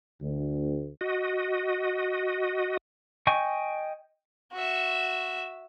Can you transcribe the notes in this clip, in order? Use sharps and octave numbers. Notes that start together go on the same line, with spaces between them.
D2
F#4 D#5
D#5 G5 G#5 C#6
F#4 E5